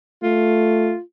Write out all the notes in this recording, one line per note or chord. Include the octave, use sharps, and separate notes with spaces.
A3 F4